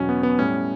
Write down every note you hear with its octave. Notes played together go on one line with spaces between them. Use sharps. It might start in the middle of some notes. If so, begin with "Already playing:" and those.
Already playing: E2 B2 F#3 C#4
B3
B3
A2 G3 C#4